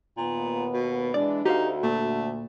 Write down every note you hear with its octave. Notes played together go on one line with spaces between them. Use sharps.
D#2 A#2 B3
B2
E3 G#3 D4 D5
D2 D#4 F#4 G4 C5 F5
A#2 A3